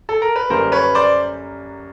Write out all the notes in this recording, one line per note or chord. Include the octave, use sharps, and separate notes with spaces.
A4
A#4
B4
F#2 D3 G3 A#3 A#4 C5
B4 C#5
C5 D5